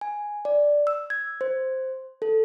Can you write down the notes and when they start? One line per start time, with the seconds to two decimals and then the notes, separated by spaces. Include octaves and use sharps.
0.01 G#5
0.45 D5
0.87 E6
1.10 G#6
1.41 C5
2.22 A4